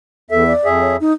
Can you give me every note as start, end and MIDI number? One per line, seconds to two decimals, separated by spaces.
0.31 0.53 40
0.31 0.44 69
0.31 0.53 76
0.47 0.67 74
0.65 0.96 41
0.65 0.96 68
0.65 0.96 76
0.81 0.96 73
1.00 1.13 63